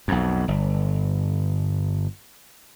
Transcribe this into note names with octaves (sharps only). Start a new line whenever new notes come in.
B1 F2
G1